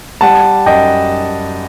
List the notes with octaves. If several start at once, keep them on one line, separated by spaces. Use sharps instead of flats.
G3 F#5 A5
F#2 D#5 G5